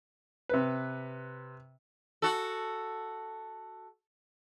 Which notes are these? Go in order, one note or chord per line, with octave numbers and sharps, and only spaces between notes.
C3 B4
F#4 A4